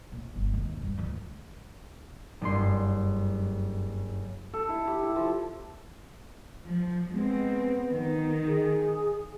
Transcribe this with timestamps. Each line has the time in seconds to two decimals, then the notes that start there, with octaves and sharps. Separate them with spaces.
0.12 A#2
0.36 G1
0.53 G#1 D#2
0.82 G2
0.97 D2 F3
2.41 F#1 G2 C6
4.53 A4
4.69 E4
4.87 G4
5.03 E4
5.16 F3
6.66 F3
7.13 G#3 B3 C4
7.91 D#3
8.47 G#4